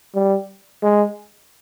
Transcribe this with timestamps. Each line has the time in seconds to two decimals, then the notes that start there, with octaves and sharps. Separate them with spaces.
0.15 G3
0.82 G#3